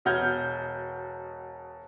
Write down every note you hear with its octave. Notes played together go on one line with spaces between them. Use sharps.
E1 B2 F#5 F6 G6 G#6